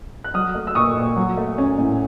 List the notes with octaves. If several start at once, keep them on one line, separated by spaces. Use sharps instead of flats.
F#6
F#3 D#6 F6
A3
E6
A#2 C#6 D#6
A#2
F#3
A3
C#4
A2